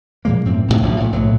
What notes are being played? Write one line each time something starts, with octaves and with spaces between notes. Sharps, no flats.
A#2 F3 G#3 A#3
F#2 A2 C4
C#2 F#2 A2
A1 B2 F3 F#3
A#2 A3
B1 A2 F3 F#3